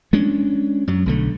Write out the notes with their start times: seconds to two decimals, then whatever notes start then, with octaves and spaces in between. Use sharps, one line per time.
0.13 G#3 C#4 D4
0.88 F#2 F#3
1.06 B1 D3 A3